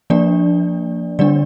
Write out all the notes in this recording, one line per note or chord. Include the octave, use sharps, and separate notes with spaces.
F3 A#3 D4 D5
D3 G3 D4 D5